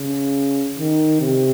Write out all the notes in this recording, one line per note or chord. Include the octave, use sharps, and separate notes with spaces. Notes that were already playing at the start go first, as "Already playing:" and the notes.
Already playing: C#3
D#3
C3